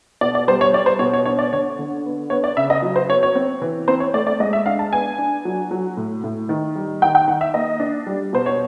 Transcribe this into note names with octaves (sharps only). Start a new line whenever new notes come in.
B2 D5
D5
G3 C5
C#5
G3 D5
C5
B2 C#5
C#5
D4 C#5
D5
D3 C#5
D3
B3
B3 C#5
D5
C#3 E5
D#5
F#3
C5
B3 C#5
C#5
C4
E3
C4 C5
C#5
A3 D5
D5
G#3 D#5
E5
D4 F5
A5
B3 G#5
D4
F#3
F#3
A2
A2
D#3
G3
D#3 G5
G5
D#3 F#5
E5
A#3 D#5
D4
G3
B2 C5
C#5